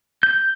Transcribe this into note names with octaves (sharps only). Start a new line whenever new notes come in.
G6